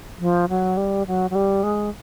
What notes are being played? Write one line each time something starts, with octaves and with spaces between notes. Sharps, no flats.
F3
F#3
G3
F#3
F#3
G3
G#3